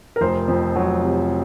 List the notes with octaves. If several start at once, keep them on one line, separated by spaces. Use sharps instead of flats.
A#4
F1 C5
F2
F#3
C3